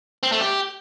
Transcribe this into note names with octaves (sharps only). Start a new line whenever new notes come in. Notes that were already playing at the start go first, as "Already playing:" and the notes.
C4
A3
G4